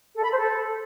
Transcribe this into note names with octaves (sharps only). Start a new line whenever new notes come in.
A4
B5
C5
A4